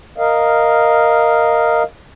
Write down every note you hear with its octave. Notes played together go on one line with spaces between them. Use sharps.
A#4 D#5 F5